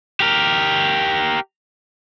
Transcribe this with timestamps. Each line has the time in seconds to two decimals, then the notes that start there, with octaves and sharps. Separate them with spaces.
0.20 G4 A#4